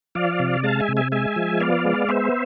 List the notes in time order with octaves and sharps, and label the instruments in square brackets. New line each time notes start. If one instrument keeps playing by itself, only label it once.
[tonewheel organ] F3 D5 F5
C3
G#3 F5 A5
E5 G#5
C3
E5 G#5
G#3 E5 G#5
F3
B3 D5 F5
G#3
B3 C5 E5